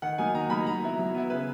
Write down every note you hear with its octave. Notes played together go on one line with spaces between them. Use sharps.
D#3 F#5
F#3 A#3 D#4 G#5
D#3 A#5
F#3 A#3 D#4 B5
F#3 A#5
B3 E4
F#3
B3 E4
C#3 B4